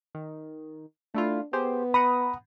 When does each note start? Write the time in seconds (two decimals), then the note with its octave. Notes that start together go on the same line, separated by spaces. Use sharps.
0.15 D#3
1.14 A3 D4 E4 F4
1.53 B3 G4 G#4 C5
1.94 F#5 A#5 B5 D#6